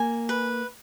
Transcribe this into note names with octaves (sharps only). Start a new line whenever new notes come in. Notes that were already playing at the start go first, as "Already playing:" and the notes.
Already playing: A#3 G#5
B4